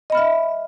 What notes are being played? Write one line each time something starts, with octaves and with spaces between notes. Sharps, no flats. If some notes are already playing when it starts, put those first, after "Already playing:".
D#5 E5 B5 F6